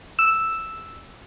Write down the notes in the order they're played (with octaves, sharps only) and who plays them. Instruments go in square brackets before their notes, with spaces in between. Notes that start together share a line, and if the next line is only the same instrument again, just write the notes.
[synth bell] E6 E7